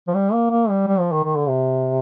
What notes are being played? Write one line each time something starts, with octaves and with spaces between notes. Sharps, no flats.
F3
G3
A#3
A#3
G3
G3
F3
D#3
D#3
D3
C3